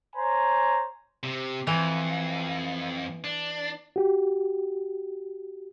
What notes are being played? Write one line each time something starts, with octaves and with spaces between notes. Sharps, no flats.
C5 C#5 G#5 A#5
C3
F2 E3
D4
F#4 G4